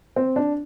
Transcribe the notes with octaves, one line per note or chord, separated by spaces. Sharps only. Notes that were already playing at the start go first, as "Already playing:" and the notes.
C4
D4